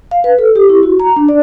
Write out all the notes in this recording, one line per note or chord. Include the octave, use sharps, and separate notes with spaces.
F5
B4
A4
G4
E4
F#4
A#5
D4
D5